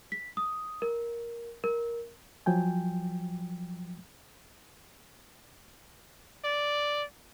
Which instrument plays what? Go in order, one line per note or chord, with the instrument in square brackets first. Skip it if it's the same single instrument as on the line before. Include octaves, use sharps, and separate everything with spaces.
[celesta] B6
D#6
A#4
A#4
[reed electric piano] F3 F#3 G5 G#5
[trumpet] D5